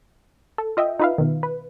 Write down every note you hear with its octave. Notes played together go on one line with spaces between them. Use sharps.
A4
F4 D#5 E5 G5
D#4 F4 B4 E5 F5
B2 D#3
B4